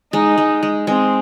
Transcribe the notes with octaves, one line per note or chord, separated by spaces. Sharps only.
G#3 D#4
G#3
G#3
G#3 C4